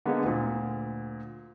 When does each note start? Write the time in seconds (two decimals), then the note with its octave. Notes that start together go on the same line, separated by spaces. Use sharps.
0.05 D3 G#3 A#3 B3
0.24 D2 A#2